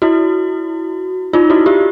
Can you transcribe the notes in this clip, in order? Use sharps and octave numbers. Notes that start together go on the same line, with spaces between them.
E4 F#4
D#4 F4
E4 F#4
F4 G4